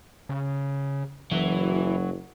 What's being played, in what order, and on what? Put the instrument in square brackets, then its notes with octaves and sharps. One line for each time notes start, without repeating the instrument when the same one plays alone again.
[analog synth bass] C#3
[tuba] F#1 [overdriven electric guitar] E3 [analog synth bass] F#3